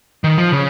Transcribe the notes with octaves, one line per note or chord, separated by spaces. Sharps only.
D#3
F3
C#3